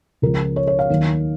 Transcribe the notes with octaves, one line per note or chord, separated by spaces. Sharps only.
C#2 C#3 F3 G#3 A#4
C#5
C#5
F5
D#2 D#3 F#3